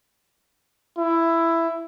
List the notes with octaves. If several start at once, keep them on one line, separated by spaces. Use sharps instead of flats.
E4